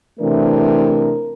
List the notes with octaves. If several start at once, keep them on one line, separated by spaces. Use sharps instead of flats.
C3 E3 A3 D4 A#4